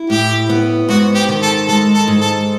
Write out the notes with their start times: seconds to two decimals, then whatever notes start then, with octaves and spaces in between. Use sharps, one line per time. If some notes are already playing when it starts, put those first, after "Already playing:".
Already playing: E4
0.10 A2 G4
0.49 B3
0.89 G#2 F#4
1.15 G4
1.28 D#3
1.42 A4
1.68 G#3 A4
1.94 A4
2.08 G#2
2.21 A4